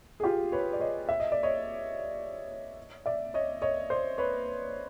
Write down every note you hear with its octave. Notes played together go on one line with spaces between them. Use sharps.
G#4
F4 G4
B4 C#5
D5
C#5 D#5
E5
D#5
D5
C#5 D#5
D5 E5
C#5 D#5
C#5 D#5
C5 D5
B4 C#5